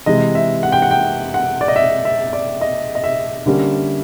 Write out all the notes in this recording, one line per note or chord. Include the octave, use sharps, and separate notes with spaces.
C3 E3 G#3 D#5
E5
F#5
G5
F#5
G5
F#5
D5
D#5
E5
E5
D5
D#5
D#5
E5
D3 G3 A#3 C#4